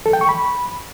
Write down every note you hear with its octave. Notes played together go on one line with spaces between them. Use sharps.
A4
G5
C#6
B5